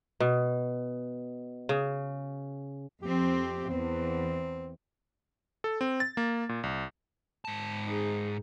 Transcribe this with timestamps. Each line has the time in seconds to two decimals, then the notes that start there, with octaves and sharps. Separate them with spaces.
0.20 B2
1.69 C#3
3.03 F2 C4 G4
3.70 E2 C4
5.64 A4
5.81 C4
6.00 A6
6.17 A#3
6.49 A#2
6.63 C2
7.45 G#2 A5
7.85 D#4 G#4